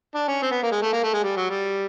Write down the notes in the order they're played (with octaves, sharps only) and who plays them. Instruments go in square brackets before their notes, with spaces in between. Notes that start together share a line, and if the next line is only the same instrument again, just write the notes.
[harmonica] D4
C#4
C4
B3
A#3
G#3
A3
A#3
A3
G#3
G3
F#3
G3